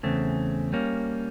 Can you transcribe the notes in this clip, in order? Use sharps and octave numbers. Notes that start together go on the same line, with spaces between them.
E2 C#3 A3 C4
G3 A#3 C#4